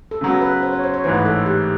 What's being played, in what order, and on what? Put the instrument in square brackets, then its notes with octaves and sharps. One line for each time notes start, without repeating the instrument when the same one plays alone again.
[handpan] A4
[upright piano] C#3 F#3 B3
[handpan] B4
C5
C#5
C5
C#5
[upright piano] A1 G#2 E3 [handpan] C5
[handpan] B4
A4
G4